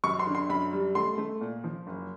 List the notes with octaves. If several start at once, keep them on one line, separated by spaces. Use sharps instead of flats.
F#2 C#6
C6
D3
C6
F#2 B5
G3
A3 C6
A3
A#2
F3
F#1